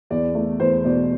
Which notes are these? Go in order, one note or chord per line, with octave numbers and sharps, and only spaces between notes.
E2 D5
A3
E2 C5
B2 D5